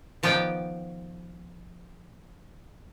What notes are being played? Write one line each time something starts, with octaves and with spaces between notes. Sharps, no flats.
D#3 F3 B3 D5 G5